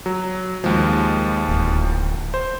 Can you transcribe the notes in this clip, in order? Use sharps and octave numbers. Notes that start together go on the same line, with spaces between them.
F#3
D#2 F3 G#3
D1
C5